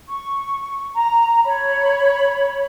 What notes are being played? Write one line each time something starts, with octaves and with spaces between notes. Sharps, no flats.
C#6
A#5
C#5 B5